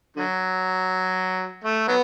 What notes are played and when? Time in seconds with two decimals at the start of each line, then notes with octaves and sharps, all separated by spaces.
0.16 D3 F#3
1.64 A3
1.88 F#3 B3